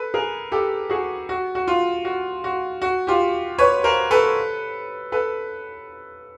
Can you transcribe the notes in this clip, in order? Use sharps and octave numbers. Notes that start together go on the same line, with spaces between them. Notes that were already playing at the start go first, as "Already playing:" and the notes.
Already playing: A4 B4
G#4 A#4
G4 A4
F#4 G#4
F#4
F#4
F4
F#4
F#4
F#4
F4 G4
B4 C#5
A#4 C5
A4 B4
A4 B4